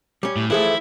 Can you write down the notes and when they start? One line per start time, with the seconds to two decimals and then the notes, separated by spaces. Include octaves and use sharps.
0.23 G3 C#4
0.36 A2
0.50 E3 F3 A3 E4 G#4 A4 E5